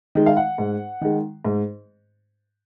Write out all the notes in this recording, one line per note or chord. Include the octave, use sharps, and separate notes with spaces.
D#3 G#3
F5
F#5
G#2
D#3 G#3
G#2